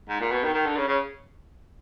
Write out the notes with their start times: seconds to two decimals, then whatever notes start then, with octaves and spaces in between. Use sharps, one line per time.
0.09 G#2
0.21 A#2
0.32 B2
0.43 D#3
0.54 D#3
0.66 D3
0.77 C#3
0.88 C#3